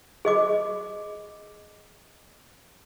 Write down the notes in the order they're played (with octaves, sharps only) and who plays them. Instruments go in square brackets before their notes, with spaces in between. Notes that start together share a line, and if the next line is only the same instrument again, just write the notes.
[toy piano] G#4 D#5 D6